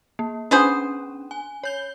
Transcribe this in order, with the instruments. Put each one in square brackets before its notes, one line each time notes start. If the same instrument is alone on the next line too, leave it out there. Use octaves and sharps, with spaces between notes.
[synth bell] A#3
[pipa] B3 G#4 C5 [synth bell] C#4 D4
[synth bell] G#5
C#5 G6 G7